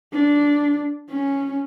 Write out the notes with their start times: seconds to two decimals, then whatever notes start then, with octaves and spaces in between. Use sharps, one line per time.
0.13 D4
1.10 C#4